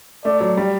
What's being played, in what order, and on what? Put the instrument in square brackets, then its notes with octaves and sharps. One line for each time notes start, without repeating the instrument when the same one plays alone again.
[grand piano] A3 [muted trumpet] D5
[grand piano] F#3
G3